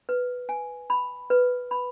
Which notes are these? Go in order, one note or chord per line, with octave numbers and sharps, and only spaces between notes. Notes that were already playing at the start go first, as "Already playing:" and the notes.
B4
G#5
B5
B4
B5